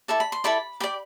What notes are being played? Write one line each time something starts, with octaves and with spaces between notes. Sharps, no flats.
E4 A4 D5
B5
C6
E4 A4 D5 B5
G4 D5 B5